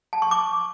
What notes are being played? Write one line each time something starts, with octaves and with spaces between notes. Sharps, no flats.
A5
C#6
D6